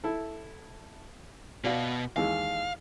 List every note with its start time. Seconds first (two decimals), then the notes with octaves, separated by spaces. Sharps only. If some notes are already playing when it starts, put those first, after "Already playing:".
0.04 E4 A4
1.64 B2 F#4 D5 F5
2.16 D#2 E3 G#3 F5